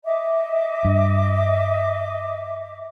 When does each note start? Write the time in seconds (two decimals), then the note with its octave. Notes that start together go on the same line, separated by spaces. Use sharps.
0.04 D#5 E5 D6
0.85 G2